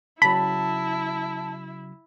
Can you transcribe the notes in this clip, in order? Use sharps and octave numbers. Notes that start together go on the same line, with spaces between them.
C#3 F#3 E4 A5 B5